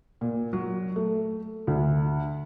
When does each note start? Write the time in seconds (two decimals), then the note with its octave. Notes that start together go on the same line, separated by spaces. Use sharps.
0.21 A#2
0.53 F#3
0.96 A3
1.67 D2